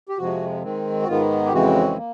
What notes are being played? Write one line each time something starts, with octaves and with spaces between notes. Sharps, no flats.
G4
F2 C3 F3 G#3 F#4
D#3 G#3 C4
F#4
G#2 D#3 G#3 B3 F4
G4
F2 C#3 E3 G#3 C4 F#4
A#3